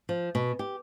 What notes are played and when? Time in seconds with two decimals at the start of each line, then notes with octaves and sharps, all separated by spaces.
0.09 F3
0.35 B2
0.59 G4